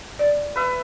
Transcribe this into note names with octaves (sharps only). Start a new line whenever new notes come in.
D5
B4 E5